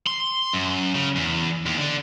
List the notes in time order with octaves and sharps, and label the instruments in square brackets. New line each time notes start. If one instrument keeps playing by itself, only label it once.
[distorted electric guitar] C6
F#2
C#3
E2
D#2
D3